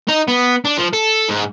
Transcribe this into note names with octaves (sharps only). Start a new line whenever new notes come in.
D#4
B3
D4
F3
A4
G#2